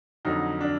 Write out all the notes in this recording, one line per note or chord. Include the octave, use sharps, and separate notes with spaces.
F2 D3 F#3 D#4
D4